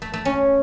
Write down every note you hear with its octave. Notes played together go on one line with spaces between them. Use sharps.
A3
A3
C#4